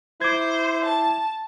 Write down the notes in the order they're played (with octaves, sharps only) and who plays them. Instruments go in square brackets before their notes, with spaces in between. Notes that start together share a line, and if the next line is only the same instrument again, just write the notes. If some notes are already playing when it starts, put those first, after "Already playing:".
[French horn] E4 [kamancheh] C5 [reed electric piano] D6 G#6
[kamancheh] A5